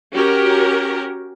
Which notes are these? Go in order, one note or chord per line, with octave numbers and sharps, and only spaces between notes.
C#4 F#4 G4 A#4